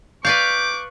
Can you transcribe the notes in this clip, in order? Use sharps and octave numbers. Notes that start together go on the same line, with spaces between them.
B4 D5 F5 C#6 D6 F#6 G6